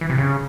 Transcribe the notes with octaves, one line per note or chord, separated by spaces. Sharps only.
E3
C3
C#3